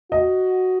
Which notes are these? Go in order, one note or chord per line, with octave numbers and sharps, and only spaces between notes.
F#4 D#5